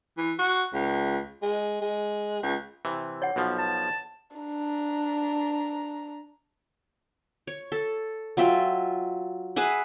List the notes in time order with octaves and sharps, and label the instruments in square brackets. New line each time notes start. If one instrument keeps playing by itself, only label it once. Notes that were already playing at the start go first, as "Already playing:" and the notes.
[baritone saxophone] E3
F#4
C#2
G#3
G#3
C#2
[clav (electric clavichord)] C3 E3
[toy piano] C#5 F#5
[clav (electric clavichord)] B1 B2 F3
[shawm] A5
[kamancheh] D4 A#5
[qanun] C#5
A4
F#3 F4 E5 G5
G#4 B4 E5 F#5